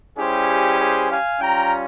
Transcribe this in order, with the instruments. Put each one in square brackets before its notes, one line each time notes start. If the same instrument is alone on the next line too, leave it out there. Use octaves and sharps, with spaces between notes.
[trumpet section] G3 C#4 E4 G4 G#4 C5
G#4 C5
F5 G#5
G3 C#4 F4 G5 A#5